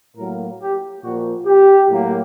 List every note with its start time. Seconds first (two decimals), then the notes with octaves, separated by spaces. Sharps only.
0.17 A2 F#3 A#3 A#4
0.60 G4
1.03 A#2 F3 A#3 F#4
1.46 G4
1.89 A2 F#3 A#3